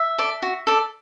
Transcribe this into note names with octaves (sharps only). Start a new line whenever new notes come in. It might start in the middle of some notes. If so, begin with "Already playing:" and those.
Already playing: E5
A4 D5
F#4
A4 D5